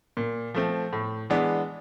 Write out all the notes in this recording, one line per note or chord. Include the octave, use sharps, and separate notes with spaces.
A#2
F3 A3 C4
A2
E3 G#3 B3 D4